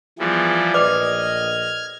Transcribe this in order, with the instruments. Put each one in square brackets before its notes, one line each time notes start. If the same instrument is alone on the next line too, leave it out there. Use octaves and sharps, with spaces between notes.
[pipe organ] E3 F3 G3 [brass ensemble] B3 G#4
[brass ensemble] A#1 A3 D#5 [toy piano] B4 D5 D6 [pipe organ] F6 G#6